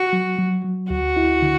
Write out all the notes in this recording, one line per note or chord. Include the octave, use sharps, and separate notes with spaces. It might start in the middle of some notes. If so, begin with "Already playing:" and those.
Already playing: F#4
F#3
F#3
F#3
D2 F#4
E4
D3